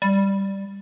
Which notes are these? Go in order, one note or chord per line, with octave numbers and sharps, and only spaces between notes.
G3